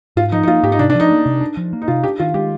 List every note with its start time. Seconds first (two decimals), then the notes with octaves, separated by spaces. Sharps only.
0.16 G#2 F4
0.32 F3 D#4
0.43 D#4
0.48 A#3 F4
0.63 G#2 G4
0.72 D#4
0.79 C3 D4
0.90 D4
0.95 F3 D#4
1.11 A#3
1.26 C3
1.41 D4
1.57 F3
1.73 A#3
1.82 D#4
1.88 C3 F4
2.03 D4 G4
2.19 D#3 F4
2.34 G#3 G4